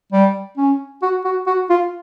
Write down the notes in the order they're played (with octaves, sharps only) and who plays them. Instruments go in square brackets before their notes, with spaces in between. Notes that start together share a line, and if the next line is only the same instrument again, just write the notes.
[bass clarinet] G3
C#4
F#4
F#4
F#4
F4